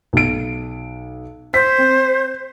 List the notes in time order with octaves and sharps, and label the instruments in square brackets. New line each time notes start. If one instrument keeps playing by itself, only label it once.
[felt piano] B1 D7
[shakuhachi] C5 [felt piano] B6
[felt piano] C4